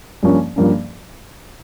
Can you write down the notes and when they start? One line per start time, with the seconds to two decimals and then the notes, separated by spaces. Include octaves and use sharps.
0.23 G2 F3 A#3 C#4
0.56 G2 F3 A#3 C#4